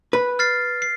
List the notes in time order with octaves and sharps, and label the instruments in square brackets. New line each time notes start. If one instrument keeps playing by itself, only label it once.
[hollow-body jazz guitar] B4
[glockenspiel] F6 A6 C7
C7